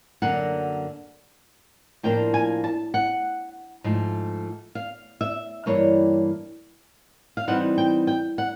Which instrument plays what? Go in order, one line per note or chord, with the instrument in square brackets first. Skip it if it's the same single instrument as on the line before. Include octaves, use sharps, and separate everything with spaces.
[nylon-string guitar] F#2 D3 F#3 A#3 F#5
A2 F3 A#3 D4 F4 G5
G#5
A5
F#5
G#2 F3 A3
F5
E5
G2 E3 G3 A#3 C#5
F5
E3 G3 C4 D#4 F#5
G5
G5
F#5